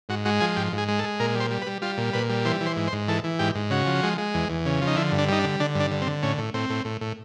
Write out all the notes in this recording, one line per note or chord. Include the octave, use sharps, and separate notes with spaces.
G#2 F#4
G#3 F#4
F3 G#4
G#2 G4
G#2
G#4
G#3
A4
G#3
A#2 A#4
G3 C5
G3
B4
G3
G3 F4
A#2
A#2 B4
G3
E3 C5
E3
C5
G#2
C5
G#2
E3 A4
E3
G#2 G4
G#2
C#3 F#4
F3
G#3
G#3
E2
E2
C#3
F3
D#4
D3 E4
G2
D4
G3 D#4
D4
D3
D3 D4
G2 D4
D3
C4
D3
A2 C#4
A2
A2 C4
A2
A2
A2